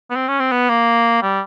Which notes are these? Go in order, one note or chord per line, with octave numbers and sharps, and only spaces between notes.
B3
C4
C#4
C4
B3
A#3
G3